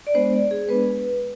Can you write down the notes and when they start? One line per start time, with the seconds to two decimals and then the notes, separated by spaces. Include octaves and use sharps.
0.07 D5
0.14 G#3 B3 D4 C5
0.33 D5
0.51 G#4
0.69 G#3 B3 D4 B4